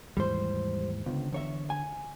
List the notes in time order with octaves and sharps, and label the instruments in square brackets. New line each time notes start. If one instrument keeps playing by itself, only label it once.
[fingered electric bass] D#2 G#2 E3 [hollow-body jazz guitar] G3 C5
[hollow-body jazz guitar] C#2 [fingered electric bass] D3 B3
[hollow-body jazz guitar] E2 C#5 E5 [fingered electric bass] D3
[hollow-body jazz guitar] G#5